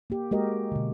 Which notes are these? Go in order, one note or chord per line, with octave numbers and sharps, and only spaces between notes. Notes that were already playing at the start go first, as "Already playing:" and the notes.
A#3 G4
G#3 A#3 F#4 G4 A#4 D#5
B2 D3